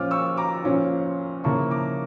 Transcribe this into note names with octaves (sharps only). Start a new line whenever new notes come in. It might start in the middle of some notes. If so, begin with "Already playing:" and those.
Already playing: A#2 F3 C#4 F4 D6 F6
C#6 E6
A#5 D6
A#2 F3 C#4 F4
C#3 F3 A#3 E4 A5 C#6
A#5 D6